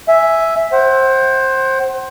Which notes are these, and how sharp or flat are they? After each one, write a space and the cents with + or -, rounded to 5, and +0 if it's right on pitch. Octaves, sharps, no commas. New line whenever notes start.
E5 +0 G#5 +0
C5 +20 F#5 +40